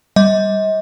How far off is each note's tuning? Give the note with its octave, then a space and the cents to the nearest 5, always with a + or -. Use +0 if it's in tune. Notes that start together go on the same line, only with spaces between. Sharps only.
G3 +0 D#5 +40